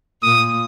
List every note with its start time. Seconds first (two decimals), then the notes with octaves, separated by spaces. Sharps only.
0.23 A#2 D#6